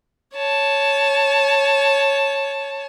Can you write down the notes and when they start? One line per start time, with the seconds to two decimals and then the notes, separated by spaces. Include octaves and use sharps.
0.35 C#5 A5